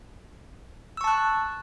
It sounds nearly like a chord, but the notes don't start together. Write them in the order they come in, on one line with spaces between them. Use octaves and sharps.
E6 C#6 A5 F#6